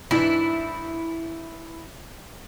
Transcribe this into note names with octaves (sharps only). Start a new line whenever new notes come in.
G#2 E3 D4 E4